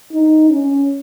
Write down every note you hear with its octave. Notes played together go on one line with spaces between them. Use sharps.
D#4
C#4